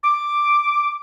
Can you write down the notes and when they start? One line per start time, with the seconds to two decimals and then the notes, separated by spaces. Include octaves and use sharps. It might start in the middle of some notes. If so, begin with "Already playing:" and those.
0.03 D6